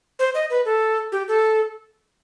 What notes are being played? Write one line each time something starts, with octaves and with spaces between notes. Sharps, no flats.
C5
D#5
B4
A4
G4
A4